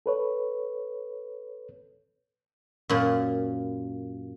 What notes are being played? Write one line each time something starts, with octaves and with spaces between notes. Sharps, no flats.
A4 B4 C#5
F#2 A#2